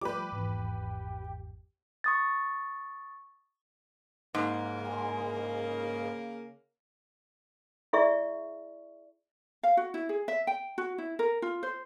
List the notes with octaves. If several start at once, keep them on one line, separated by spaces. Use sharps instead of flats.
F3 G3 A3 G4 B4 D6
G#1 E2
C#6 D#6 A6
G#2 C#3 A#3
E4 G#4 D5 E5 C#6
F5
F#4
E4
G#4
E5
G5
F#4
E4
A#4
F4
C5